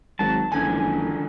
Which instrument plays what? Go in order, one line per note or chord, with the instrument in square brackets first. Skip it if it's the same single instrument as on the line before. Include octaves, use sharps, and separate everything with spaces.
[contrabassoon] G#1 [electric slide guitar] F#3 [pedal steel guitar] A5
[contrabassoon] F#1 [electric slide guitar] D3 D#3 F3 [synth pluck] G#5